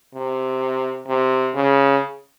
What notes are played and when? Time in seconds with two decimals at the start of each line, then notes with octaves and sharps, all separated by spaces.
0.15 C3
1.07 C3
1.55 C#3